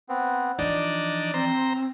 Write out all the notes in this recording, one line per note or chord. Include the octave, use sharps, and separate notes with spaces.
B3 C4
E3 F3 D4 D#4 D5
C4 C5 A#5